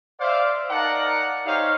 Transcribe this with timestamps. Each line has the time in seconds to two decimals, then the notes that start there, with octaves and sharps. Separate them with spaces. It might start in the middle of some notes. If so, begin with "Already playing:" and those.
0.20 C5 D5 E5 F5
0.71 D#4 A#4 D5 F5 F#5 A5
1.46 D#4 G4 C5 C#5 F5